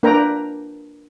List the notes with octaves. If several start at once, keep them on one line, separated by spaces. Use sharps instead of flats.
A#3 D4 A#4 B4 G5 A#5